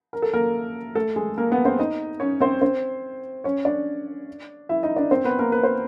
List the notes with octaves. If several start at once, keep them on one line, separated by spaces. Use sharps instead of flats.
A#4
A4
A#3 A#4
A3 A4
G#3 G#4
A#3 A#4
B3 B4
C4 C5
D#4 D#5
C#4 C#5
C4 C5
C4 C5
C#4 C#5
D4 D5
E4 E5
D#4 D#5
D4 D5
C4 C5
B3 B4
A#3 A#4
B4
C5